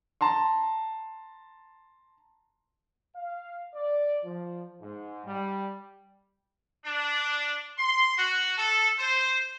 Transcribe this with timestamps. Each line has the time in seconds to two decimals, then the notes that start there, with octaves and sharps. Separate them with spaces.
0.21 A5 A#5 C6
3.16 F5
3.74 D5
4.24 F3
4.81 G#2
5.25 G3
6.85 D4
7.77 C6
8.17 F#4
8.57 A4
8.98 C5